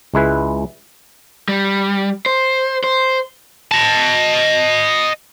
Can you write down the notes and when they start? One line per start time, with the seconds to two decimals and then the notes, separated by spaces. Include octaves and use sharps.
0.14 C#2 G#3 E4 B4
1.48 G3
2.26 C5
2.84 C5
3.71 D#5 A5